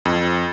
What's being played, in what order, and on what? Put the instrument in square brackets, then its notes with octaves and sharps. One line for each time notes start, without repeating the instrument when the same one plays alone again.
[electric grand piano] F2